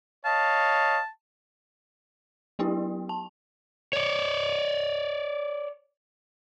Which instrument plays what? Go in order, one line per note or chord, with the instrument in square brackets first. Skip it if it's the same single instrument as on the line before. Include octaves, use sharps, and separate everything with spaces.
[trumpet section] C#5 D#5 F5 [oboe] A5
[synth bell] F#3 B3 E4 G4
A5
[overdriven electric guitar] C#5 D5